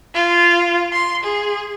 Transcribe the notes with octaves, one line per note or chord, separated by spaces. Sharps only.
F4
C6
G#4